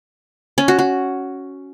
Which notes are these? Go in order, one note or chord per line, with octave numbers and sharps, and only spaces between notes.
C#4
F#4
F#4